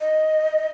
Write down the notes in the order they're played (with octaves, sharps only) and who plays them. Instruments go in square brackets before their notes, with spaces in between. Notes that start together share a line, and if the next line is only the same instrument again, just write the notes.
[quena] D#5